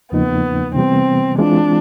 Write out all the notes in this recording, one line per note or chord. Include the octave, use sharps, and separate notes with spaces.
E2 C#3 F3 A#3 B3 D#4
C3 E3 G3 B3 C4
E3 G#3 C4 D4 F4